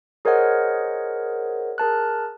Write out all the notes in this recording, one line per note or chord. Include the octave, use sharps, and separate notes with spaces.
G#4 A#4 C5 C#5 D#5 F#5
G#4 A#4 A5 F#6